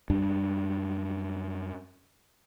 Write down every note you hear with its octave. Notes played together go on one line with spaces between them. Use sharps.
F#2 G3 D4